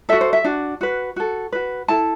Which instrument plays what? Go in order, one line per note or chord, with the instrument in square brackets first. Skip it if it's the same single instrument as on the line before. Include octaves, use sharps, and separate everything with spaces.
[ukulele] F#4 A4 E5
C5
E5
D4 F#4
F#4 B4
F#4 A4
F#4 B4
E4 A4 A5